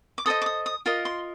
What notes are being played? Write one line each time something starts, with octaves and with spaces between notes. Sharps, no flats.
D6
A4 C5 D#5 D#6
D6
D#6
D#6
F4 A#4 D#5
C6